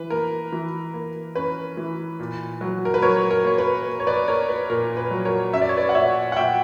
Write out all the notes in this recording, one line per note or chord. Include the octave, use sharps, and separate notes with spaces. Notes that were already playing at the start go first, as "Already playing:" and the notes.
Already playing: E3 B4
A#3 A#4
E3
A#3
C#4 B4
E3
A#2
F#3
A#4
B4
F#3 A#4 C#5
A#4
A#3 C#5
B4
A#3
C#5
B4 D5
A#3 A#4 C#5
B4
A#2 A#4
B4
F#3
A#4 C#5
C#4 E5
D5
C#5
B4 D5
F#5
A#2 C#5 E5
F#5
A#2 E5 G5